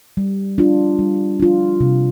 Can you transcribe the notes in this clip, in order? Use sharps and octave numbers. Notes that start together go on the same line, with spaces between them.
G3
D4 F4
G3
D4 F4
C3